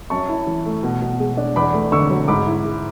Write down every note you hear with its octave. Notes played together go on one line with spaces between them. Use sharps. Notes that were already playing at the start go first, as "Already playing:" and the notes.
F#2 A5 C#6
E4
E3
A3
B2
B2
G#3
D4
E2 B5 D6
A3
D3 C#6 E6
F#3
G#2 B5 D6
E4
G#3